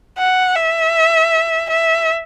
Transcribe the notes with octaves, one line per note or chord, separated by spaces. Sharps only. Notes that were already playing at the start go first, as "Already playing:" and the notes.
F#5
E5
E5